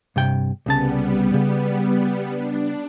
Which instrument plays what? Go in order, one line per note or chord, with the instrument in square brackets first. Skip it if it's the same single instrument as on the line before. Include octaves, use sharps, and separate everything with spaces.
[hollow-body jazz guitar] G2 C3 G5
[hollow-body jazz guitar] C2 C#3 A5 [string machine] G3 B3
[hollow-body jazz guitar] C#3
[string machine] D4